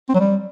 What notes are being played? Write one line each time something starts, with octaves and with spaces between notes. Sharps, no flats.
C4
F#3
G3